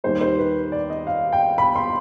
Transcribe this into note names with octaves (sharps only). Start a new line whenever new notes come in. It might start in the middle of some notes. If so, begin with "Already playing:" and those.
D#2 D#3 G3 C5
C5
B4
D5
D#5
F5
G5
B5
C6